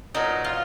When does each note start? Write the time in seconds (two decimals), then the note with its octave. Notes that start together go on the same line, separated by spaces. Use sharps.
0.15 A#2 F#3 B3 D#4
0.45 F4